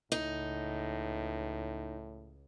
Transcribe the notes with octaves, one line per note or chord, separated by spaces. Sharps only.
C#2 A2 D#4